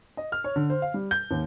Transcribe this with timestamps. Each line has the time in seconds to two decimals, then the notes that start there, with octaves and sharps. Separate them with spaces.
0.17 D#5
0.32 F6
0.44 C#5
0.56 D3
0.70 C5
0.82 F5
0.94 G3
1.11 G6
1.31 D#2